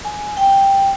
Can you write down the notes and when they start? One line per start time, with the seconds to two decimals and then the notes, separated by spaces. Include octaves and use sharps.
0.05 G#5
0.37 G5